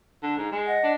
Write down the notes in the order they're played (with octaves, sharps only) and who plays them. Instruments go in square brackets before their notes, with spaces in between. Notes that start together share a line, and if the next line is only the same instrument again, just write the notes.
[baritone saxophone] D3
G#2
G#3
[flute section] D#5 F#5
[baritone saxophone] D4